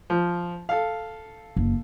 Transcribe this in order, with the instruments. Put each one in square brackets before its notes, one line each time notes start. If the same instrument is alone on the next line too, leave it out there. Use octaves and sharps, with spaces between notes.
[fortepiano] F3
A4 F5
[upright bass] F#1